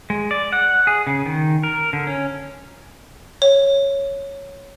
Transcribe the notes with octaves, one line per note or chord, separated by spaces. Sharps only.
G#3
D5
F#5
G#4
C#3
D#3
A#4
D3
C#4
C#5